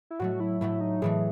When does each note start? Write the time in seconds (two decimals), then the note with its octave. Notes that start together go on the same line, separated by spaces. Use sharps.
0.10 E4
0.19 A2 F#3 A3 F#4
0.40 E4
0.61 A2 F#3 A3 E4
0.81 D#4
1.02 A2 E3 A3 G#4